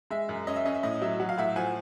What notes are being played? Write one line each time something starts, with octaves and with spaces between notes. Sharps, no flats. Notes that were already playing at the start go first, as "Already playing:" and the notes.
G#3 E5
F#2
C#4 D#5
E5
C#4 D#5
E5
A2 D#5
F#3 E5
F#3 F#5
F5
A2 E5 F#5
F3 F#5 G#5